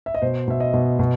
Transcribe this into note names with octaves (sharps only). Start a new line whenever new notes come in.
E5
D#5
B2 C5
B2 E5
D#5
B2
B2